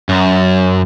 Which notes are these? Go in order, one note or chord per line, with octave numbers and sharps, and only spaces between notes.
F#2